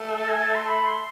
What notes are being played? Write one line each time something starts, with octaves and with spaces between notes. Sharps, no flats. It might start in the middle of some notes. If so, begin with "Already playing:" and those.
Already playing: A3
A4
G#5
A5
C6
B5
C6